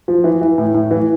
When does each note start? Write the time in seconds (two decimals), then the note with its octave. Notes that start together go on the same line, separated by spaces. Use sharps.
0.08 F3
0.24 E3
0.41 E3
0.58 A2
0.74 A2
0.91 E3